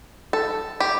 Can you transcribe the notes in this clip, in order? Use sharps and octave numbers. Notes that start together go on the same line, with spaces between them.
A4
G4